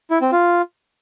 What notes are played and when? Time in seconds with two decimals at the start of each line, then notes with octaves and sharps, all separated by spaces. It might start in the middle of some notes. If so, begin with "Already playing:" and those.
0.11 E4
0.21 C4
0.32 F4